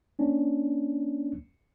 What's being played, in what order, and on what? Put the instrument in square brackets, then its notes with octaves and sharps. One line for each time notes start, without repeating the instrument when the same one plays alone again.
[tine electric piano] A#3 C#4 D4